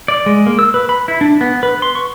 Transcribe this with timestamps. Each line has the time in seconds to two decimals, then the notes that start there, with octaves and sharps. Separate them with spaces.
0.08 D5
0.26 G#3
0.46 A#3
0.59 E6
0.74 B4
0.89 B5
1.08 E4
1.21 D4
1.41 B3
1.63 B4
1.82 C6
1.95 C#6